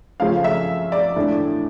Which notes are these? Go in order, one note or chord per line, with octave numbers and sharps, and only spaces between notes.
C#3 F3 A3 C#4 F5
E5
D5
A2 E3 A3 D4